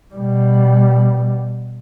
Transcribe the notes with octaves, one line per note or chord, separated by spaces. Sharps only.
B2 G3